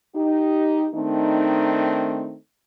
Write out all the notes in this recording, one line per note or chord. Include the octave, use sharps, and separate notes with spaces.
D#4 G4
D#3 A3 C4 D4 D#4